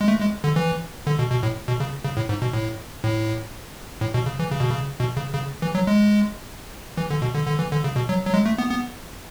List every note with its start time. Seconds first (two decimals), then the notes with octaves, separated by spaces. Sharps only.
0.01 G#3
0.08 A3
0.20 G#3
0.44 D3
0.56 E3
1.07 D3
1.19 B2
1.31 B2
1.43 A2
1.68 B2
1.80 C#3
2.05 C#3
2.17 A2
2.29 G#2
2.42 B2
2.53 A2
3.04 A2
4.01 A2
4.14 B2
4.26 C#3
4.39 E3
4.51 C#3
4.60 B2
4.71 C#3
5.00 B2
5.17 C#3
5.34 C#3
5.62 E3
5.75 F#3
5.87 G#3
6.97 E3
7.11 D3
7.22 B2
7.35 D3
7.47 D3
7.59 E3
7.72 D3
7.84 C#3
7.96 B2
8.09 F#3
8.26 F#3
8.34 G#3
8.46 A3
8.58 B3
8.71 B3